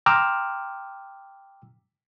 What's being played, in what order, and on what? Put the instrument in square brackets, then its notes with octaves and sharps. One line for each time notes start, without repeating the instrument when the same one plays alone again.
[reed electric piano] G5 A#5 C6 D6 E6 F6